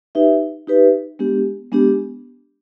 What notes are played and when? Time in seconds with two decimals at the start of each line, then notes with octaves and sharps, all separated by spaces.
0.15 D#4 G4 B4 E5
0.67 D#4 G4 B4 E5
1.19 G#3 B3 D4 G4
1.72 G#3 B3 D4 G4